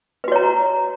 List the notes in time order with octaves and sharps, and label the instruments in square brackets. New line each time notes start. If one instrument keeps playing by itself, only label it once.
[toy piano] B4
F#4
C#5
A#5